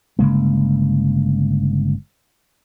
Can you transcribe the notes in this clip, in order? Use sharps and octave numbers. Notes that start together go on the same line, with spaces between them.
G1 C#3 G#3 A#3